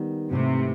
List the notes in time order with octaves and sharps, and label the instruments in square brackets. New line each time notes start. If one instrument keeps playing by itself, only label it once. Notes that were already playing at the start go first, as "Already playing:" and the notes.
Already playing: [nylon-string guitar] D#3 G3 B3
[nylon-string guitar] G#2 E3 A3 [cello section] C3